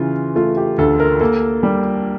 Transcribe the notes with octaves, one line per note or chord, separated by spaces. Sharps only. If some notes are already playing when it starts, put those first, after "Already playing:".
Already playing: C#3 E3 F4
A3 F4
G4
D2 A4
A#4
A#3 A4
G3